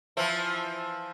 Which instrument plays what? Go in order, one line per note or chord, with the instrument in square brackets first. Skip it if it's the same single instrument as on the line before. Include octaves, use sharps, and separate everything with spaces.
[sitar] E3 F3 E4